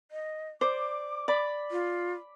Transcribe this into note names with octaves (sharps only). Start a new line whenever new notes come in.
D#5
C5 D5 D6
D5 B5
F4